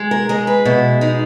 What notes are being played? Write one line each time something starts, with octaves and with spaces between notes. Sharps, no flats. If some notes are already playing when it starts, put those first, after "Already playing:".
Already playing: G#3
A#4
G#3 A#4
B4
B2 E4
G#3 D#4